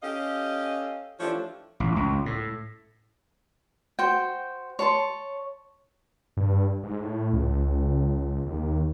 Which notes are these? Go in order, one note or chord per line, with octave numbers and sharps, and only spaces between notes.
C#4 G4 A4 D#5 F5
E3 F3 A3 D4 G4 C#5
A1
C#2
A2
F#4 C5 G5
C#5 A5 C6
G2
G#2
A2
C#2
D#2